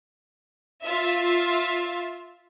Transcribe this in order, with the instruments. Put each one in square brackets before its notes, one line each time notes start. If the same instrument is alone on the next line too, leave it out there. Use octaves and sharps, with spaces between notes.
[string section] F4 E5